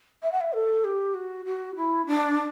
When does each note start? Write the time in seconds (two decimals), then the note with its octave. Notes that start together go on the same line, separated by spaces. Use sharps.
0.22 E5
0.32 F#5
0.41 E5
0.53 A4
0.84 G4
1.14 F#4
1.46 F#4
1.76 E4
2.07 D4